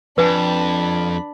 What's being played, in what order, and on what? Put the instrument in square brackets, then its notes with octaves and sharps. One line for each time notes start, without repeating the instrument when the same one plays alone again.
[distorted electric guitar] F2 [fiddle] D4 B5 [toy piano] B4 G#5